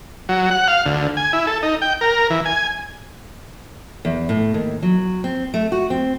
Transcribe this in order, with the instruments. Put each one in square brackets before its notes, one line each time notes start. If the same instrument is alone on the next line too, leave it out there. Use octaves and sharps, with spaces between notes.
[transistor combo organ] F#3
F#5
F5
D2
G#5
E4
A4
D#4
G5
A#4
E3
G#5
[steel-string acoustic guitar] E2
A2
D#2
F#3
C4
A3
F#4
C4